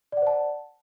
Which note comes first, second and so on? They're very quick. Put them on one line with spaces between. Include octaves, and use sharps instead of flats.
D5 F#5 C5 A5